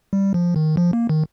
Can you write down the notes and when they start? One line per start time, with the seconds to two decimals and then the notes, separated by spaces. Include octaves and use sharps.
0.13 G3
0.34 F3
0.56 D#3
0.77 F3
0.93 A#3
1.09 D#3